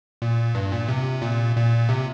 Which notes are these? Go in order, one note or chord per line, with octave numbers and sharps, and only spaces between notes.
A#2
G2
A#2
C3
A#2
A#2
C3